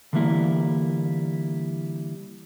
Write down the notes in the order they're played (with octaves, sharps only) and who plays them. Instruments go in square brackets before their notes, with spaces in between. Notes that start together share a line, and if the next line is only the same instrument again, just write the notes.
[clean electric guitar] D3 E3 G3 A#3 E4